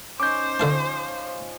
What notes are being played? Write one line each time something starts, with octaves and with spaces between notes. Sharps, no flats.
C#4 D#4 C5 D6 G6
D3 F3 F5 A5